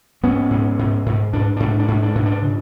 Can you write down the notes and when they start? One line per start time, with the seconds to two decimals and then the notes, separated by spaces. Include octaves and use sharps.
0.23 G#2 B3 C#4
0.51 G#2
0.79 G#2
1.06 G#2
1.33 G#2 D4
1.57 G#2 D4
1.79 D4
1.88 G#2
2.03 D4
2.15 G#2
2.26 D4
2.42 C#3